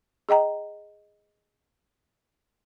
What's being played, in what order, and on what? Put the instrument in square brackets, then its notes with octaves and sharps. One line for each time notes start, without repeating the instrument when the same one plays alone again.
[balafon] G#4 D#5 G5 A#5